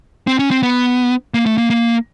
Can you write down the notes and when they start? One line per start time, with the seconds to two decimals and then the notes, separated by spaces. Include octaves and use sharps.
0.27 C4
0.39 C#4
0.51 C4
0.63 B3
1.34 A#3
1.46 A3
1.58 A#3
1.70 A#3